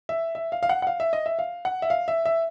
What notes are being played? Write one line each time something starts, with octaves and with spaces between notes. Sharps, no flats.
E5
E5
F5
F5
F#5
F#5
F5
E5
D#5
E5
F5
F#5
E5
F5
E5
E5